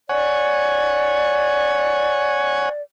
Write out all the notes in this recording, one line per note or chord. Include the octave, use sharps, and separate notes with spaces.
C#5 D5 F#5 G#5